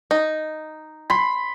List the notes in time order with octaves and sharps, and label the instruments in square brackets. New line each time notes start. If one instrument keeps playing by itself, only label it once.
[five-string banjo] D#4
[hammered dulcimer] B5 C6